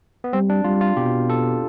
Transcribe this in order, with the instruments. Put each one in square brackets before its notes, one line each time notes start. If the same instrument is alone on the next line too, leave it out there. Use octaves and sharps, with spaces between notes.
[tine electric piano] B3
[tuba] G3 [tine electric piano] C4
[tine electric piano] D4
[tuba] G3 [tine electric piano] F4
[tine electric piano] F4
[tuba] B2 [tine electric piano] G4
[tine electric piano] A4